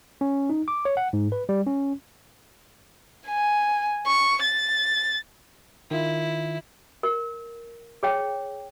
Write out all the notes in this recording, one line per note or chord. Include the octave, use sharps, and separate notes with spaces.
C#4
D#4
D6
C#5
F#5
G#2
B4
G3
C#4
G#5
C#6
A6
D#3 E4 F4
A#4
G#4 C#5 G5